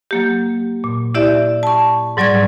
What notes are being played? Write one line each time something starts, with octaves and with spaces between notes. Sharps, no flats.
F#3 A#3 G4
A#2
E4 G4 D5 E5
A5 C#6
G#2 F#3 G3 D5 C#6 G#6